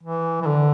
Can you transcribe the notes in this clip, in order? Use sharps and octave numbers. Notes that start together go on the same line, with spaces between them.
E3
E3
D3